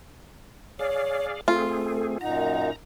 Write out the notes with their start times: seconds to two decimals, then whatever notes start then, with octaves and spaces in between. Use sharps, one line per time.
0.79 G#4 C#5 D5 F5
1.48 A3 C4 F4 G#4 A4
2.21 F#2 A#2 D#4 F#5 A#5